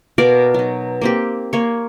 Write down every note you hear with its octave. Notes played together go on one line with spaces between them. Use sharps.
B2 A#4 D5 F5
F#3 D#4
A#3 C4 G4
A#3 C#5